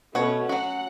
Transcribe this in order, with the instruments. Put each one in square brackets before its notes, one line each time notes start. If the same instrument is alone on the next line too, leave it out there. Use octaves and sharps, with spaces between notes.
[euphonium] B2 [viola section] A3 C#4 [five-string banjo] F#4 C#5
[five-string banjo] F#3 F#4 [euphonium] C#4 [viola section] F#5